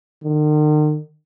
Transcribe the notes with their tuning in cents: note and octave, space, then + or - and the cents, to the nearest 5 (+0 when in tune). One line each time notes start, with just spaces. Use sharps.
D#3 -45